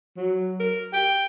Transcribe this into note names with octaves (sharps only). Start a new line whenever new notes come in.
F#3
A#4
G5